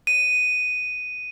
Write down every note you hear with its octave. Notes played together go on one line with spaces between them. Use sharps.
D#7